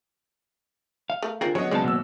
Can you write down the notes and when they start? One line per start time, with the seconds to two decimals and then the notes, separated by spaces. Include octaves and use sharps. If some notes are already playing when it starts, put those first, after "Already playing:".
1.10 F5
1.22 A3 A#4
1.41 D3 C4 F4 G#4 A#4
1.55 F#3 B3 C#4 C#5 D#5
1.71 C#2 C#3 G#3 C4 C#5 D5 A5
1.84 G#1 B2 A#3 E6